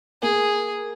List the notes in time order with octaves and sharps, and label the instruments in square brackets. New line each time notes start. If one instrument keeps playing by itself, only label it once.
[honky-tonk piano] A#3 [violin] G#4